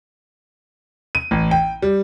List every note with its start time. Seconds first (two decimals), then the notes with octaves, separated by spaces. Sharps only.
1.15 D#7
1.31 A1
1.51 G5
1.82 G3